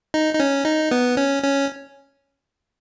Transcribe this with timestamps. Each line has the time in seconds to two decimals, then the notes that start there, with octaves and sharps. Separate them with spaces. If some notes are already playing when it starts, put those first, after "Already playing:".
0.14 D#4
0.34 D#4
0.40 C#4
0.66 D#4
0.91 B3
1.17 C#4
1.43 C#4